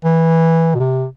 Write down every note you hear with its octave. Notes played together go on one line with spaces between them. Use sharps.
E3
B2
C3